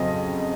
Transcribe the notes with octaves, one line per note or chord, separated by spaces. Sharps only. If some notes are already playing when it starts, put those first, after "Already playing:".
Already playing: F2 C#3 F#3 C4 D#5